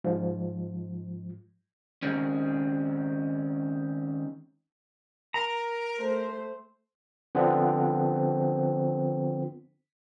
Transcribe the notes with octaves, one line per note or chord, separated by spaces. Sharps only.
G#2 F3
D#3 G#3 C4 C#4
A#4 A#5
A3 C5
D3 F3 B3 C4